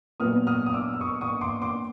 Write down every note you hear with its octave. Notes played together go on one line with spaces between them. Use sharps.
A#2 F#3 B3 D#6 F6
D#6 F6
D#6
D6 E6
E6
C#6 D#6
C#6 D#6
C6 D6
C6 D6